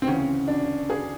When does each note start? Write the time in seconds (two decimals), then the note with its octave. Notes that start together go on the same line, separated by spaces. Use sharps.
0.02 C4
0.07 D2 C#3 E3 C#4
0.48 D4
0.90 G#4